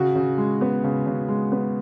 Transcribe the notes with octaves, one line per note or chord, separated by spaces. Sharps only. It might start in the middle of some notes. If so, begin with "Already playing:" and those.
Already playing: C#3 F#4
C#3
G#3
B3
C#3
C#3
G#3
B3